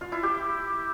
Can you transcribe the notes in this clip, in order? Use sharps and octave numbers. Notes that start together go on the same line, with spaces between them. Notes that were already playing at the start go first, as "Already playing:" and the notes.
F4
E4
G4